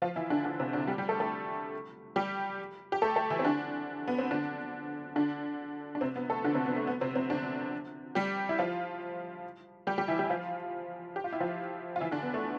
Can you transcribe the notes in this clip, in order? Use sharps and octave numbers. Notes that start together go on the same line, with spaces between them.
F3 F4
E3 E4
D3 D4
D3 D4
C3 C4
D3 D4
G3 G4
G3 G4
A3 A4
A3 A4
G3 G4
G4
A3 A4
A3 A4
E3 E4
C4
D3 D4
B3
C4
D3 D4
D3 D4
D4
C3 C4
B3
A3 A4
D3 D4
C3 C4
B3
A3
B3
C3 C4
C3 C4
D3 D4
G3 G4
E4
F3 F4
G3 G4
G3 G4
E3 E4
G3 G4
E4
F3 F4
G4
F4
E4
F3 F4
F4
E3 E4
D3 D4
B3
A3